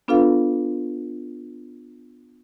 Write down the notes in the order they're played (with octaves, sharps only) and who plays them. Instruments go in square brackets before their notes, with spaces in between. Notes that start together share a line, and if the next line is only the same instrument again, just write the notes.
[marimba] B3 D4 F4 A4 B4 F5